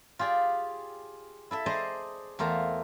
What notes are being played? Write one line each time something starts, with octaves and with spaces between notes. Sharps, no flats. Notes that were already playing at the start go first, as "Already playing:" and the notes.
F4 G4 G#4 D5
E4 A4 E5
G#4 C5 D5 D#5 A5 A#5
E2 A3 A#4 C5 F5